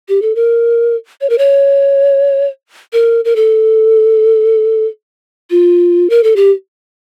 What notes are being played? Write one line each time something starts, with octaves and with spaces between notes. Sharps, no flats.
G4
A4
A#4
C#5
A#4
C#5
A#4
A#4
A4
F4
A#4
A4
G4